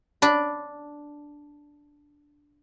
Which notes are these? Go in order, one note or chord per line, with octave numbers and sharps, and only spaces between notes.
D4 B5